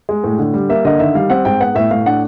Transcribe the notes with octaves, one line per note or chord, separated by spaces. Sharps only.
G#3
A2
D3
G3
A#3 E5
D3 D#5
D#3 E5
G3 F5
C4 F#5
G#2 G5
B3 F#5
A2 E5
A2 F5
D4 F#5